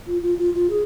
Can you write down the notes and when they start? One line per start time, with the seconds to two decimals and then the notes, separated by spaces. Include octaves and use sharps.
0.07 F4
0.22 F4
0.38 F4
0.54 F4
0.70 G#4